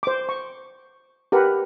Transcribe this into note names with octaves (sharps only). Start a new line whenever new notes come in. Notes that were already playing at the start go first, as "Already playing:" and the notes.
C5 D6
C#6
G4 A#4 B4 F#5